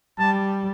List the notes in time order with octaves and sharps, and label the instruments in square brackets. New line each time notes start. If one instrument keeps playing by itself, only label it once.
[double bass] G3 [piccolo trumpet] A5